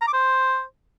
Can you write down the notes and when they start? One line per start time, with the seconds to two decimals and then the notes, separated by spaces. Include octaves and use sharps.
0.02 A#5
0.07 D6
0.13 C5